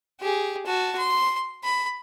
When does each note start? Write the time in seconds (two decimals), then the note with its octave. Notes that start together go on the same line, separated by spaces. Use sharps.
0.21 G4 G#4
0.66 F#4 A5
0.97 C6
1.63 B5